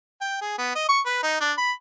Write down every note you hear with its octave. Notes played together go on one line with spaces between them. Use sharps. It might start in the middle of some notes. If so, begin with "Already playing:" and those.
G5
G#4
B3
D#5
C#6
B4
D#4
D4
B5